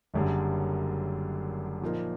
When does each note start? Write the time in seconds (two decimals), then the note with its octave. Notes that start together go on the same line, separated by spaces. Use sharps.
0.14 F#1 F#2 D3 G3
1.82 A#2 F3 A#3 D#4